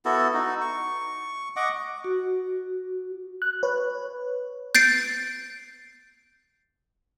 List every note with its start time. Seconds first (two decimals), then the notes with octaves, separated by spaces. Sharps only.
0.05 B3 E4 F#4 A4
0.34 D#4 F#4
0.61 C#6
1.56 D#5 F#5 C#6 D6
2.04 F#4
3.42 F#6
3.63 B4 C#5
4.75 G6 A6 C7 D7